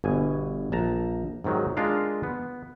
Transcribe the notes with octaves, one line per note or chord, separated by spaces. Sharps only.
G1 B2 G#5
A#1 A5 A#5
G#2 C3 D#3 F#3
G#3 D4 F4 A#4 F5
B3